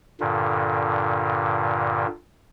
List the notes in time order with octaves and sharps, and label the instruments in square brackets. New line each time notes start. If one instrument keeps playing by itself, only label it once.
[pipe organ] G2 A#2 D3